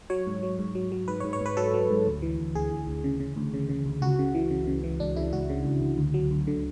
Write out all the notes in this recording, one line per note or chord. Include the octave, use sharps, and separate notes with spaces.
F#3 C#5
G#2
F#3
G#2
F#3
F#3
G#2 B4
C#5
G#2
C#5
G#2 B4
F#3 A4
F#3
G#2
D2
E3
D2
D2 G#4
D2
D2
C#3
C#3
D2
C#3
C#3
D2
C#2 F#4
C#3
E3
C#3
C#3
E3
C#2 D4
C#3 E4
C#2 F#4
C#3
C#2
C#2
D2
F#3
D2
D3